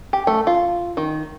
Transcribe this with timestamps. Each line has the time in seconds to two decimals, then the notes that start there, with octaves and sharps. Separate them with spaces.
0.13 G4
0.27 A3
0.47 F4
0.97 D#3